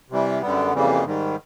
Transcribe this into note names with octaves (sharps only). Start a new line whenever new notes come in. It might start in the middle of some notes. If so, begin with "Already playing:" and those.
C3 E3 G3
F#2 D3 G3 B3
F2 C#3 E3 G3 A#3
G#2 D#3 G3